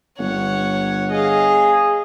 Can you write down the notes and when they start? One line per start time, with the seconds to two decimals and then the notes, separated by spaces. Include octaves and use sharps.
0.19 G1 C#5 F#5
1.12 G#4 D#5 F5